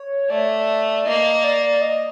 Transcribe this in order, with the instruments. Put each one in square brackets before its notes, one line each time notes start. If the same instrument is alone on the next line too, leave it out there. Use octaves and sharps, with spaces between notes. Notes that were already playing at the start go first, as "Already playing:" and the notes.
Already playing: [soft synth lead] C#5
[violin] A3 [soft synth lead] D5
[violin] A#3 [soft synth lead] D#5
[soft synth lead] D5
D#5